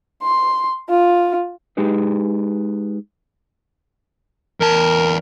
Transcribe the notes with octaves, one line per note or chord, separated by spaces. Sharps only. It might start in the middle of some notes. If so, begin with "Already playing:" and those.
C6
F4
G#3 D#4 G4 G#4 B4
E2 A#4 A5